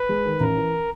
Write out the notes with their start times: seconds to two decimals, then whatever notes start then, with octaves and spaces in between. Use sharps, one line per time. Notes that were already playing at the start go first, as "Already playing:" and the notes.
Already playing: B4
0.09 G#3
0.26 D#3
0.40 A1 A#4
0.57 E3